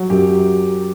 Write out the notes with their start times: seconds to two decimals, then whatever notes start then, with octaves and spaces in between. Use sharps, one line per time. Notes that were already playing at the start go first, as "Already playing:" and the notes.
Already playing: F#3
0.10 F#2 G4